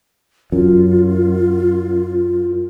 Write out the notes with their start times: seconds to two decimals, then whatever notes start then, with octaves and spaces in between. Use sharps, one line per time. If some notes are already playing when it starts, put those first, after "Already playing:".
0.52 F#2 F4